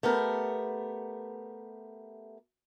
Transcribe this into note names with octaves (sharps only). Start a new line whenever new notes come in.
A3 B3 G4 A#4